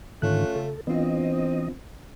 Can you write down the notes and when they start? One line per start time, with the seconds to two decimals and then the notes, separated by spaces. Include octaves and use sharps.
0.22 G#2 D3 D#3 A3 C#4 F4 F#6
0.56 C#3 A4
0.87 E3 B3 C4 D4 F4 D#5